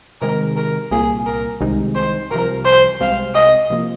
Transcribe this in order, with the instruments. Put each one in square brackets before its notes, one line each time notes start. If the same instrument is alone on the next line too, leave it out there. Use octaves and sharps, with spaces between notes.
[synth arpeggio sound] C3 D#3 G#3 [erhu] A#4
[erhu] A#4
[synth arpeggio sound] C2 A#2 A#3 [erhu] G#4
[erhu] A#4
[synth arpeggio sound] C2 C3 D#3 G#3 D#4
[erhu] C5
[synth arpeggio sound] C2 C3 F3 [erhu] A#4
[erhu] C5
[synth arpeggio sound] C2 C3 G#3 C4 [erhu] F5
[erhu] D#5
[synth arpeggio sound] C3 F3 A#3 F4